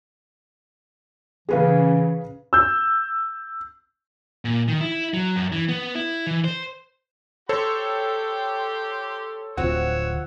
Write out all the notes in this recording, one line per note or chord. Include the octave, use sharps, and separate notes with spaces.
C#3 E3 G#4 B4 F5
E6 G6
A#2
D#3
E4
F#3
F#2
E3
B3
E4
E3
C5
G4 A4 C5 C#5 G5 C6
D1 D2 F3 C4 F#4 C#5 F#5 E6